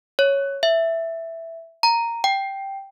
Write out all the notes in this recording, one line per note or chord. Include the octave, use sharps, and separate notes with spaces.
C#5
E5
A#5
G5